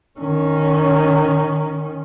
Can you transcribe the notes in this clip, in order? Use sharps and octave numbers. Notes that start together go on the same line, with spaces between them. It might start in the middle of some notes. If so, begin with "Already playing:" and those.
D#3 C#4